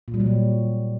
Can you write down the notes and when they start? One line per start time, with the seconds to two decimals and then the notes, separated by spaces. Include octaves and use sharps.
0.08 A#2
0.14 G3
0.20 F#3
0.26 A#2